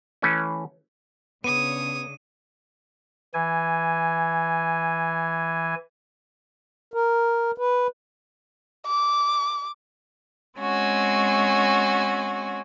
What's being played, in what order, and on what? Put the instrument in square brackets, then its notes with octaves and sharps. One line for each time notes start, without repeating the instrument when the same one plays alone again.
[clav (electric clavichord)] E3 A3 C#4
[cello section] C#3 D4 [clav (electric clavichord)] B3 [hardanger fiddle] C#5 D#6 [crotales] D#7
[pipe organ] E3 G#5
[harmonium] A#4
B4
[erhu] D6
[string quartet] G#3 C4 C#4 F#4